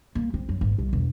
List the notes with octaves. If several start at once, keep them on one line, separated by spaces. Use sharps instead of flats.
A#3
C4
F#2
G#1
C2
E1